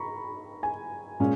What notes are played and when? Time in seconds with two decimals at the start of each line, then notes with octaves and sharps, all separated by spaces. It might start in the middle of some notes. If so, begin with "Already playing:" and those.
Already playing: A#5 B5 C#6
0.63 G#5
1.20 A#2 G#3 C#4